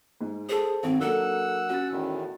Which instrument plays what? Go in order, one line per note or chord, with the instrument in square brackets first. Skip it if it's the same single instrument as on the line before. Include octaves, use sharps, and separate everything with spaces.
[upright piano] G#2 G#3
[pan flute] G#4 [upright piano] A4 C5
[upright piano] G#1 F#2 [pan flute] C4
[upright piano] F#3 A#3 D4 [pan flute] A4 [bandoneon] F#5 E6
[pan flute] C#4 [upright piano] F#4 A6
[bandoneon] E2 A2 D#3